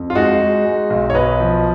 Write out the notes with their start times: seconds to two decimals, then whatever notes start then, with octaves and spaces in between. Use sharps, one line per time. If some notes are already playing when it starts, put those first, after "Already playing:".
Already playing: F2
0.10 F4
0.15 G#3 D#4 F#4
0.40 G#3
0.66 G#3
0.90 B1
1.10 C#5
1.15 B1 B4 D#5
1.40 F3